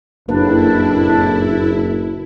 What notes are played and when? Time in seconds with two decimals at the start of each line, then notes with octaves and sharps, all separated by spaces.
0.29 F#1 F2 A2 A#3 D4 E4 B4